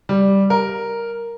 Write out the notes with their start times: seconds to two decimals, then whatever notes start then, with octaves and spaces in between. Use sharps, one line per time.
0.09 G3
0.50 A#4